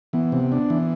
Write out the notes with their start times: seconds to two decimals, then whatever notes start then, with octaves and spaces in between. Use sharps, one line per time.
0.13 E3 B3
0.32 C3
0.52 D4
0.70 E3